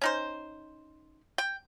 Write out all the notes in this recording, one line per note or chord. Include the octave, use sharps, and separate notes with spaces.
C#4 D#4 C5
G5